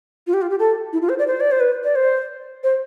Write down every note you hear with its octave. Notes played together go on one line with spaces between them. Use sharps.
F4
G4
F4
G4
A4
E4
F4
C5
D5
C5
D5
C5
B4
D5
C5
C5